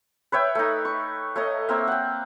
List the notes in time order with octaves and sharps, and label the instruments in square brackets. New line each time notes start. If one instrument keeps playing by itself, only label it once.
[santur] B4 C#5 E5 G5
A3 D#4
C#6
A3 C#5 D#5
A#3 C4 E5
F#5 G5